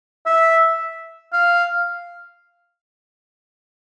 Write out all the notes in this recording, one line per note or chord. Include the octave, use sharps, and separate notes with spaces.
E5
F5